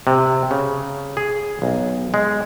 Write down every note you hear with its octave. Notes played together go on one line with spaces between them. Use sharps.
C3
C#3
G#4
B1
G#3